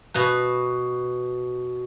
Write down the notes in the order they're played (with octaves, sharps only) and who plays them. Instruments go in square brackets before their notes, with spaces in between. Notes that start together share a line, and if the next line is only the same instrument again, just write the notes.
[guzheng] B2 B4